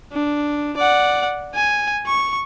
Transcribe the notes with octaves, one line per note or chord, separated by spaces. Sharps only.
D4
D5 F#5
G#5
C#6